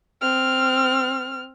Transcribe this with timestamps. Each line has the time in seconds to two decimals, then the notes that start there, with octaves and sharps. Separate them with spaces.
0.22 C4 F6